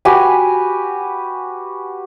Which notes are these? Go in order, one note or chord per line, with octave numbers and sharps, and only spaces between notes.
F#4 G4 B4 G#5